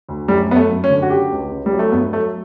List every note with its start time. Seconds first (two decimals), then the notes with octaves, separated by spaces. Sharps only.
0.09 D2
0.28 F#2 G3
0.49 F#2 B3
0.56 A3
0.70 F#2
0.84 C#4
0.90 D3
1.02 F#4
1.10 C#3 G4
1.32 C#2
1.51 C#3
1.66 G3
1.73 F#3
1.79 A3
1.92 G2 B3
2.13 F#3 A3